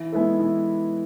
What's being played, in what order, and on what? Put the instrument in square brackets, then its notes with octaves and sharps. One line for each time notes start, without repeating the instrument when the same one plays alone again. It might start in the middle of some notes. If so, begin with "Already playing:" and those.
Already playing: [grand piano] E3
G#3 B3 E4 A4
E3